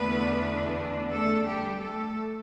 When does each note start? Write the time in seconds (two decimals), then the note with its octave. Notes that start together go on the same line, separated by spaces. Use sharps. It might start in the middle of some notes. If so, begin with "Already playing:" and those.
Already playing: E2 D3 A3 B3 D4 B4
1.12 A3 A4
1.48 G3 G4
1.83 A3 A4